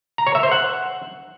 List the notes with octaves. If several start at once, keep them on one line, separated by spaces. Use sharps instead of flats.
A#5
C#5
E5
C5
F#5